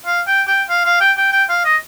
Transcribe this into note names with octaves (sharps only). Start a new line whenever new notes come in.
F5
G5
G5
F5
F5
G5
G5
G5
F5
D#5